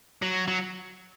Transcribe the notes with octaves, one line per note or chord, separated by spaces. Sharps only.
F#3
F#3